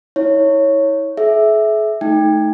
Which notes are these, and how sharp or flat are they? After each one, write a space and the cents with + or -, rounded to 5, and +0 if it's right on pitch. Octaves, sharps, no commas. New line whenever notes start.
E4 -35 C#5 +0
G#4 +45 E5 -5
A3 -20 D#4 +10 G5 +25